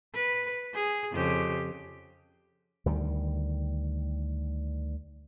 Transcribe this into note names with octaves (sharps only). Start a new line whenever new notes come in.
B4
G#4
F2 C#3 G4
D2 D#3 G3